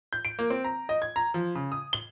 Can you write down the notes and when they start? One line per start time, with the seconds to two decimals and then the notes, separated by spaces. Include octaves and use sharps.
0.13 G6
0.25 D7
0.39 A#3
0.50 C4
0.64 A#5
0.89 D#5
1.02 G#6
1.16 A#5
1.34 F3
1.55 C#3
1.72 D#6
1.93 G7